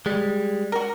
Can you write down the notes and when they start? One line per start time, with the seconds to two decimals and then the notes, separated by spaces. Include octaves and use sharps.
0.06 G3 G#3
0.72 F#4 A#4